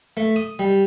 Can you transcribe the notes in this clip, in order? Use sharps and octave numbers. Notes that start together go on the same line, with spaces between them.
A3
D#6
G3